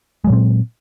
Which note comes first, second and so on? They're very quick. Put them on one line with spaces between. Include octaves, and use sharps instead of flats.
G#3 F#3 A#2 C4